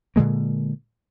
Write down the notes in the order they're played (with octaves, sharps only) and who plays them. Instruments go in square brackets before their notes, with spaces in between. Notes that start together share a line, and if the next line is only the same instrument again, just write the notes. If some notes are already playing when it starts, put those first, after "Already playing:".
[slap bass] A#2 D3 G#3 A#3